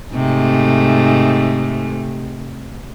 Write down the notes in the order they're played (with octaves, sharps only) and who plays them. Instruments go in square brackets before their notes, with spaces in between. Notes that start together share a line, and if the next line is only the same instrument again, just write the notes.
[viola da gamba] G#2 C3 A3